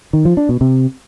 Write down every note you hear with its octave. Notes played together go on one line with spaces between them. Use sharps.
D#3
F3
D4
B2
C3